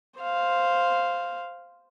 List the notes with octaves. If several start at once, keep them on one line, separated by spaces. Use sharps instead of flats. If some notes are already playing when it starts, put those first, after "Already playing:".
C5 F5